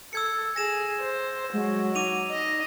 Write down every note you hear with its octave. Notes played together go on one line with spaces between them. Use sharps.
A4 E6 G#6 C#7
G#4 A#6 E7
C5
F#3 G#3
D#4 D6 D#7 F7
D#5